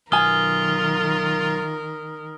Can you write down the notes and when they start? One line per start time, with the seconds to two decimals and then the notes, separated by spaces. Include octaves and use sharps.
0.12 B1 D#3 F4 A#4 G#5 D#6 F6 G7